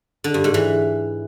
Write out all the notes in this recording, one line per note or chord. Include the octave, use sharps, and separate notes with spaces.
D3
G2
G#2
E3